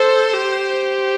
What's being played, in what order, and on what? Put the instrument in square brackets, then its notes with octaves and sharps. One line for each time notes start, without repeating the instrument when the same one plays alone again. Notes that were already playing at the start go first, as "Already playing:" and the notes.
Already playing: [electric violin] A4 [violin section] C5
[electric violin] G4